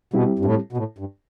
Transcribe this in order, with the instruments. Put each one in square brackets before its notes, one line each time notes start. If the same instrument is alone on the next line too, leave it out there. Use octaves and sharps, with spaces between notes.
[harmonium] B2 [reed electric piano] G3 C4 E4 G4
[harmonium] G2
A2
B2
A2
G2